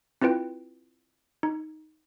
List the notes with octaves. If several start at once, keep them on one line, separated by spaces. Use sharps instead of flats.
C4 E4 F4 B4 G5
D#4